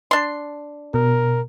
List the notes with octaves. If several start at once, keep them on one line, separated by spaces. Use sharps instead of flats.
D4 C6
B2 A#4